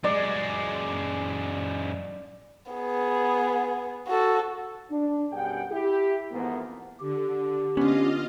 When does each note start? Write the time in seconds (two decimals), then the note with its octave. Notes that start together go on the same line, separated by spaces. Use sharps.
0.04 F#2 G#3 D5
2.71 B3 G#4
4.08 F#4 A4
4.91 D4
5.32 F#2 B2 G3 G#4 F#5 G5
5.71 E4 G4
6.32 F2 G#2 E3 A#3 B3
7.00 D3 G4
7.77 D3 B3 C#4 F4 D#5 F5